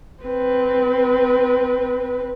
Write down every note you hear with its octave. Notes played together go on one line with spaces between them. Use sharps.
C4 B4